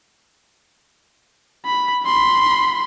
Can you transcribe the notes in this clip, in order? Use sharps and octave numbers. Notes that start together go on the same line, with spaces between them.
B5
B5 C6